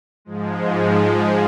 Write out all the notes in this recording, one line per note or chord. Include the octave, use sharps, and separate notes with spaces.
G#2 F3 G#3